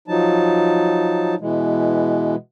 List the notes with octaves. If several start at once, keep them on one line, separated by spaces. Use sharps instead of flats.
F3 F#3 D#4 A5
B2 E3 G#3